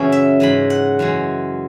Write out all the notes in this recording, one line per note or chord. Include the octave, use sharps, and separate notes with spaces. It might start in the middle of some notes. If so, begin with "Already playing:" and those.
Already playing: F#2 C#3 E3 B3 C#4 E4
E5
G#2 E3 G#3 B5
F#5
F#2 E3 G#3